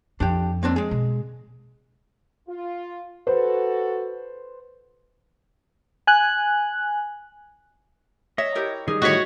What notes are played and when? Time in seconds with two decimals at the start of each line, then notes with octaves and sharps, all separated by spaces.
0.20 F2 D4 G4
0.63 A#3 C4 D4
0.76 G#3 G#4
0.91 B2
2.48 F4
3.27 F#4 A4 B4 C5
6.07 G#5 F#6
8.38 C#5 D#5 E5
8.55 E4 G4 A#4
8.88 D#3 G3 D#4 G#4
9.02 A2 F#4 C#5 D#5 B6